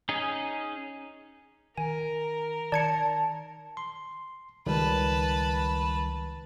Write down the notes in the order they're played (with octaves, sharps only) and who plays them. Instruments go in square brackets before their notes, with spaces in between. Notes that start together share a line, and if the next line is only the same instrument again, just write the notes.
[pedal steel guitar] C#4 D#4 G#4
[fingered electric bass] D#3 [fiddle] A#4 [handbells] G#5
[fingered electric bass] D#3 [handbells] D5 G#6 C#7 [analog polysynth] A5
[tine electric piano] C6
[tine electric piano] C#2 D#3 G3 [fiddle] B4 A5